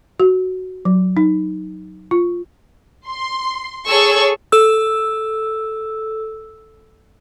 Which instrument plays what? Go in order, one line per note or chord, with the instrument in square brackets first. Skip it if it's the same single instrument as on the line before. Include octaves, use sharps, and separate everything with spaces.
[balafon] F#4
F#3
D#4
F4
[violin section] C6
G#4 A4 C#5 C#6 E6
[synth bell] A4 E6